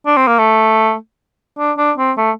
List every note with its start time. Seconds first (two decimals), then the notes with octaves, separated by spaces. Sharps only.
0.06 D4
0.17 C4
0.27 A#3
0.39 A3
1.58 D4
1.78 D4
1.98 C4
2.17 A3